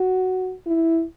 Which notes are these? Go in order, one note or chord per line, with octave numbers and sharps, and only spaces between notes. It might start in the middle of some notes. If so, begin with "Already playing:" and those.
Already playing: F#4
E4